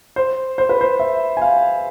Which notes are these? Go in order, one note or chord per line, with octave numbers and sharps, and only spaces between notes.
C5
C5
B4
C5
E5
G#5
F5